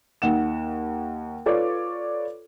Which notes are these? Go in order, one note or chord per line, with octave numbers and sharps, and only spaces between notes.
D#2 F#5 E7
F4 A4 B4 C#5 D5 D6